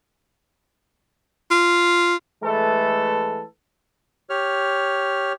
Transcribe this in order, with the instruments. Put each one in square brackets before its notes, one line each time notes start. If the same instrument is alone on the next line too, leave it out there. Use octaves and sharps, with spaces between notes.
[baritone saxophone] F4
[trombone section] E3 G#3 A3 A4 B4
[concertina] G4 C#5 F6